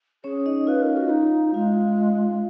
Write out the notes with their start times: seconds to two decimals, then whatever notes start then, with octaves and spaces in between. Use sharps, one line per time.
0.24 C#4 G#4 C#5
0.46 D#4 D#5
0.67 F4 B4 F5
0.82 A#4
0.97 F#4
1.10 D#4
1.54 G#3 F4 F5